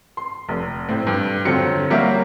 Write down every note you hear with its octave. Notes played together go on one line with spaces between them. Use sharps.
C6
F1
A2 C4
G2
F2 D3 F#3 C4 F4 C#7
F#3 G3 A#3 F#4 E5 F5